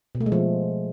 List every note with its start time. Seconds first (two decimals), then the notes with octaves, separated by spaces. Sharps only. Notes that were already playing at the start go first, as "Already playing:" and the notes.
0.15 B2
0.20 A3
0.26 G#3
0.32 F3